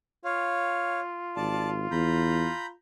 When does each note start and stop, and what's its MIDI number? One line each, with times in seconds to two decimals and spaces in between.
0.25 2.73 65
0.25 1.00 73
0.25 1.00 77
1.36 1.91 32
1.36 1.69 74
1.36 1.69 81
1.91 2.48 40
1.91 2.66 82
1.91 2.66 83
1.91 2.66 91